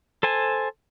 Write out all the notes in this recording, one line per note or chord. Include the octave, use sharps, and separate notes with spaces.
A4 C5 G#5 A5